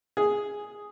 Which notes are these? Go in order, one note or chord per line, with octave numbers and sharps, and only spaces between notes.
G#4